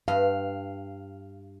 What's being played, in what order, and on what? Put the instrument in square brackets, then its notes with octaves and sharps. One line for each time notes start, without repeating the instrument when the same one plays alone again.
[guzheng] G2 [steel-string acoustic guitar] F5